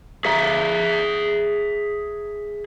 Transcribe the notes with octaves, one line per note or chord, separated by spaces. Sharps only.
G#4 E5 A#5